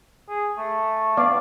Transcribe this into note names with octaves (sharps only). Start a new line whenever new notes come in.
G#4
A3
B3 D5 F5